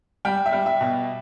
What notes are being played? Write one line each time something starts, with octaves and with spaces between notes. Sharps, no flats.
G3 G5
E5
G3
E5
B2